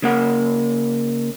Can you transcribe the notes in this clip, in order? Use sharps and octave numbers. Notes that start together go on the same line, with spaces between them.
C#3 A#3 F#5